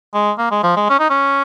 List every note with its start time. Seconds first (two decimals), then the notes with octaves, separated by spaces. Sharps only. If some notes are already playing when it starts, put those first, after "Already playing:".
0.14 G#3
0.38 A#3
0.51 G#3
0.63 F3
0.77 G#3
0.90 C#4
1.00 D#4
1.10 C#4